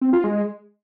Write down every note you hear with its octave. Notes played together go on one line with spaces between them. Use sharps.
C4
F4
G#3